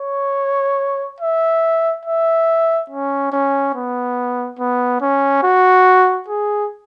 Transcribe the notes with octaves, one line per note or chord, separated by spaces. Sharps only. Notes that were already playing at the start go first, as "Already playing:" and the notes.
Already playing: C#5
E5
E5
C#4
C#4
B3
B3
C#4
F#4
G#4